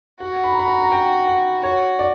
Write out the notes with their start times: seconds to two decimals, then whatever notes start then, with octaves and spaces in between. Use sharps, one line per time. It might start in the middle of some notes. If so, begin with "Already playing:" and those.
0.20 F#4 F#5
0.44 B5
0.52 A#5
0.59 B5
0.68 A#5
0.82 A#5
0.92 G5
1.27 F#5
1.63 F#4 C#5
1.99 D5